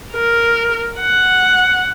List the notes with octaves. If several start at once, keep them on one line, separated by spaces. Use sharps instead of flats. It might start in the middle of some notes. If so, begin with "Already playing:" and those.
A#4
F#5